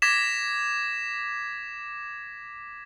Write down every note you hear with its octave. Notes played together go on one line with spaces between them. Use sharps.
D6 G#6 A#6 B6 E7